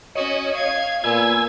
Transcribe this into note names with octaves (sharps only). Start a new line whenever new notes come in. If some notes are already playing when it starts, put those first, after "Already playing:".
C#4 F#4 C#5 D#5
F5 G#6
A#2 B3 G#5 E6 G#6